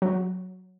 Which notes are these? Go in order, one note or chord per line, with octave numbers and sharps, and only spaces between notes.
F#3